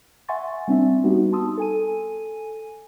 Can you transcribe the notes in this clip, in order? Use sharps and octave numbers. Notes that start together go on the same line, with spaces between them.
E5 F#5 G#5 C6 C#6 A6
G3 C4 D4 E5
G3 B3 D#4 F#4 G4
A5 C6 D#6 E6
A4 G#5 D#7